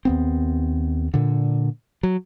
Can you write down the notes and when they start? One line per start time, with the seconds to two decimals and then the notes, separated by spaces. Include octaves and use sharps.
0.05 D#2 B3 C4
1.14 A#2 D3
2.03 F#3